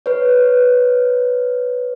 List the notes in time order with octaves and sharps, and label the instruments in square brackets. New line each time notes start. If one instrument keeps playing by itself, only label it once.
[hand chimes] B4 C#5